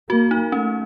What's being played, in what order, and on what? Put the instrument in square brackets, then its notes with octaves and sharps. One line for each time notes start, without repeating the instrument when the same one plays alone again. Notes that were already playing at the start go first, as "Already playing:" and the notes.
[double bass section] A#3 [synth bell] F#4
[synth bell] D#4
[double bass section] A3 [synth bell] C#4